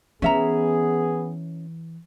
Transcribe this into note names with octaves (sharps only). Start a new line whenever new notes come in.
E3 B3 C#4 G#4 E5 A#5